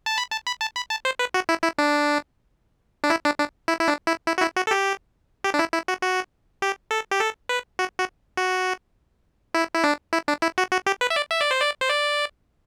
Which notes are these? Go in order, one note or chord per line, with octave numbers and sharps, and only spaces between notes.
A5
B5
A5
B5
A5
B5
A5
C5
B4
F#4
E4
E4
D4
D4
E4
D4
D4
E4
E4
D4
E4
E4
F#4
E4
F#4
A4
G4
G4
D4
E4
E4
F#4
F#4
G4
A4
G4
A4
B4
F#4
F#4
F#4
E4
E4
D4
E4
D4
E4
F#4
F#4
G4
B4
E5
D5
E5
D5
C5
D5
C5
D5